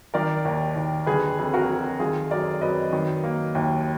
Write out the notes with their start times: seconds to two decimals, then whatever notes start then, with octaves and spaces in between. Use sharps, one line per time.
0.14 D#3 A#4 D5
0.45 D#2
0.76 D#2
1.06 D3 G#4 B4
1.39 F2
1.54 F#4 A#4
1.69 F2
2.00 D#3 F4 G#4
2.31 F#2 A#4 D5
2.61 F#2 B4 D#5
2.93 D#3
3.24 A#3
3.55 D#2